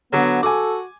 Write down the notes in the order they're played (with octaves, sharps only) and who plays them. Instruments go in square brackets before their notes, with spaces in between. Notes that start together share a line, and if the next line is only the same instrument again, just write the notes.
[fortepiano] D3 [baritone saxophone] F#3 [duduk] B3
[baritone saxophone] F#4 [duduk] A4 [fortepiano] G#5 D6